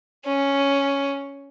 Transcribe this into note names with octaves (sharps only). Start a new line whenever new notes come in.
C#4